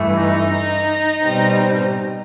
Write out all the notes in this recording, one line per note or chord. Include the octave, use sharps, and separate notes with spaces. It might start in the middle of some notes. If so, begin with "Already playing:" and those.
Already playing: G2 E3 A3
D#4
D#4
B2 G3 C4